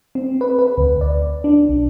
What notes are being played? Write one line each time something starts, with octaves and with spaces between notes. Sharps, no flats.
C4
B4
B4
D2
D5
D4
B1